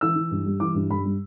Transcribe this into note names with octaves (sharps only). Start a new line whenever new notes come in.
E3 E6
E3
G2
G3
E3 D6
G2
G2 B5
G3